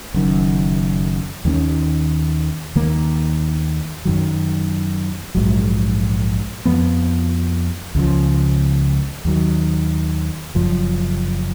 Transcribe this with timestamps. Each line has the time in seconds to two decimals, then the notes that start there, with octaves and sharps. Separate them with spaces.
0.14 F#1 F#2 D#3
1.45 D#2 D#3 A#3 C#4
2.76 D#2 D#3 A#3
4.05 F#2 D#3 F#3
5.35 A#1 G#2 F#3
6.65 F2 F3 B3
7.95 C#2 C#3 F3
9.25 D#2 D#3 F#3
10.55 F#1 F#2 F3